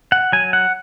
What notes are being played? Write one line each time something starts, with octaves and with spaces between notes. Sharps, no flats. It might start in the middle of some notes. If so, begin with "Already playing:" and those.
F#5
F#3 G#5
F#5